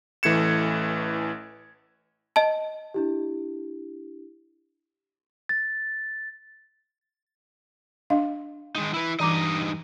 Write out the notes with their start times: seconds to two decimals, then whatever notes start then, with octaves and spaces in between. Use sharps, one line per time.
0.23 A1 E3 A3 G#6 C#7 E7
2.36 D#5 A5
2.94 D4 E4 G4
5.49 A6
8.10 D4 D#5 F5
8.75 D#3 G#3 D#4
8.94 E4 B4
9.20 G2 E3 D#4 D#5 A#5 D6